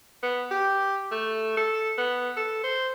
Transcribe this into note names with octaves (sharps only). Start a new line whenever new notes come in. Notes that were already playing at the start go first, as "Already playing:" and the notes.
B3
G4
A3
A4
B3
A4
C5